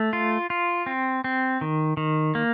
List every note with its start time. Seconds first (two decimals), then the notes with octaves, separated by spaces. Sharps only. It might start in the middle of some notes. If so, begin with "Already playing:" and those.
Already playing: A3
0.13 F4
0.50 F4
0.86 C4
1.24 C4
1.61 D#3
1.97 D#3
2.35 A#3